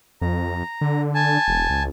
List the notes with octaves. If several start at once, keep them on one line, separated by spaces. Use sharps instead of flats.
F2 A#5
D3
G#5 A5
E1
C#2